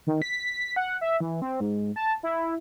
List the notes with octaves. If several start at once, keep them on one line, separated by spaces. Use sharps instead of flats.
D#3
B6
F#5
E5
E3
C4
G#2
A5
E4